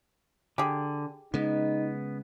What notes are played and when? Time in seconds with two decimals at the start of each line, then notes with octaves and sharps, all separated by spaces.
0.58 D3 G4 G#4
1.34 C#3 G#3 B3 D#4